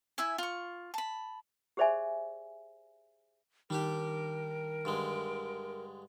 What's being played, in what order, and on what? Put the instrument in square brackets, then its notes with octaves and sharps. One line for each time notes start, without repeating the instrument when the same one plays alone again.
[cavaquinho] E4 E5 G#5
F4 C#6
A5 B5
[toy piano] G4 G#4 C5 D5 E5 G#5
[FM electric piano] D#3 [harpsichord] G3 D4 G4 [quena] A#4
[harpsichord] G2 D3 G#3